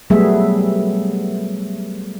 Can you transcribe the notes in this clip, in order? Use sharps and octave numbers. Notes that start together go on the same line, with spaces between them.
F#3 G3 A3 B3 G#4 E5